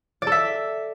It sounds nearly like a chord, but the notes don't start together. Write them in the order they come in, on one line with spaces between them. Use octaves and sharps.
D5 A4 E5